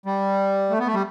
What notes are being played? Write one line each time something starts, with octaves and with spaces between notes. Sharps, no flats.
G3
A3
B3
A3
G3